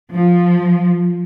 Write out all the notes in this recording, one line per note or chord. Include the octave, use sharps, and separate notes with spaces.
F3